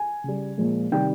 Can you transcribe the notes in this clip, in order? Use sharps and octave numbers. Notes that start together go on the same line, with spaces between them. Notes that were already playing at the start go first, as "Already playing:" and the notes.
Already playing: G#5
C#3 G3
A#2 F3 G#3
C3 D#3 G3 G5